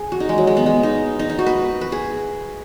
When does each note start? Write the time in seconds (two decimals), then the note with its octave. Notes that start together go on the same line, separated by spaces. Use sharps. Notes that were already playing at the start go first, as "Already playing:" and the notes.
Already playing: G#4
0.12 F#4
0.20 D#4
0.29 G#3
0.38 F#3
0.47 G#3
0.57 B3
0.66 G#3
0.83 D#4
1.19 D#4
1.30 D#4
1.39 F#4
1.46 B4
1.81 B4
1.92 G#4